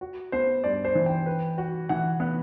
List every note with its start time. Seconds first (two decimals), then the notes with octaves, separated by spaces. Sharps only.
0.01 F#4
0.32 B3 C5
0.64 G2 D5
0.85 C5
0.95 E3
1.06 G5
1.26 B4
1.58 F#4
1.89 E3 F#5
2.20 B3